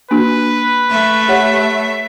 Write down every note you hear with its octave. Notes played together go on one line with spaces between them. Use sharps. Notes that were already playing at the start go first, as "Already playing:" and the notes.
A#3 D4 F#4 B4
A3 E5
G4 C#5 F#5